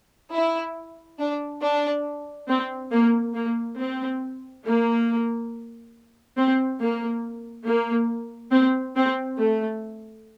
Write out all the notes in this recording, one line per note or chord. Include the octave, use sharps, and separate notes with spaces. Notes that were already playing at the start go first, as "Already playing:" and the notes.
E4
D4
D4
C4
A#3
A#3
C4
A#3
C4
A#3
A#3
C4
C4
A3